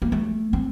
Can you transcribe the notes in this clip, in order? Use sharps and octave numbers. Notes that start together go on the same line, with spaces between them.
A#3
A3
C4